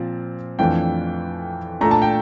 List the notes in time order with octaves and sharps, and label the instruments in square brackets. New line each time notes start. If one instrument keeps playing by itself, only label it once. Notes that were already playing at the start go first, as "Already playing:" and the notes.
Already playing: [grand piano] A#2 F3 C4
F2 E3 A3 D4 F4 G5
A#2 A3 D4 A#5
A5
G5